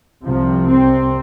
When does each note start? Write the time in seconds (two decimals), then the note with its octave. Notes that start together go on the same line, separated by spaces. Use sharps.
0.23 C2 C3 F3
0.67 C4